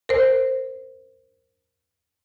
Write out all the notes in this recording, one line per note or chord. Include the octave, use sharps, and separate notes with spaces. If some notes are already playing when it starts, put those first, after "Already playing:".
A#4 C5